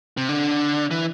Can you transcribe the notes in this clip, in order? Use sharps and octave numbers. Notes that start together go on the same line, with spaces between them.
C3
D3
E3